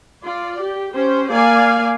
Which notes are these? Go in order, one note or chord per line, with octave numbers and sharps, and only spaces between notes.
F4 D5
G4
C#4 G4 C5
A#3 D5 F5 G#5